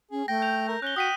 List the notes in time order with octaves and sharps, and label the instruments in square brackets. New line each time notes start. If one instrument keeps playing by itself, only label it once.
[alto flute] C#4 [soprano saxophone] G#4
[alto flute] A3 [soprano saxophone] G5 [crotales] A#6
[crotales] G6 F7
[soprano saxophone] A#4
[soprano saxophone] C#4 [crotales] F#6 G7
[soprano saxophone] F#4 [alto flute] G5 [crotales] D#6 B6 D#7